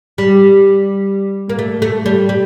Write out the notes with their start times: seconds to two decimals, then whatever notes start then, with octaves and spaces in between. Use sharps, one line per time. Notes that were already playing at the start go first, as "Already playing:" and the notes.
0.18 G3
1.49 A#3
1.59 A3
1.82 A3
2.06 G3
2.29 G3